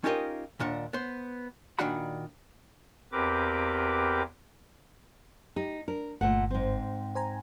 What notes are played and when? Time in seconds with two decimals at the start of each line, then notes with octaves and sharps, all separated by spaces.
0.04 C#4 D#4 F4 G4 A#4 D#5
0.60 D#2 A#2 D4 F#5
0.93 B3 C5
1.79 A#2 D#3 D4 F#4 F#5 B5
3.12 E2 C4 G4 A#4 B4 D6
5.56 D#4 G4
5.88 D4 A#4
6.21 G1 A#2 A3 F#5
6.51 G#2 C4
7.15 C5 G#5 A#5